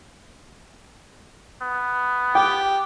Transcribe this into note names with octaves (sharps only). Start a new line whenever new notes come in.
B3
G4 G5